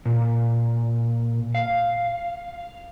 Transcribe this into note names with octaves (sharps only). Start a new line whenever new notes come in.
A#2
F5